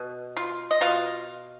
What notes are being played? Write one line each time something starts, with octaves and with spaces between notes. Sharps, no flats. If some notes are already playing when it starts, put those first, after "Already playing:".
Already playing: B2
F4
D#5
B2 F4 F5